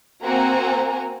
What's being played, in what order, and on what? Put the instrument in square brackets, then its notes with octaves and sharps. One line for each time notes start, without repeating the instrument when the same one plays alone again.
[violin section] A#3 C4 F#4 G#5 A#5